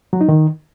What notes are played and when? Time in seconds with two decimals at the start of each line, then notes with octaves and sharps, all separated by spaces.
0.13 F#3
0.21 D#4
0.29 D#3